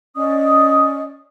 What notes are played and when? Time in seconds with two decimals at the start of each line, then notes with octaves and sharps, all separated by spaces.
0.16 C#4 D5 D#5 D#6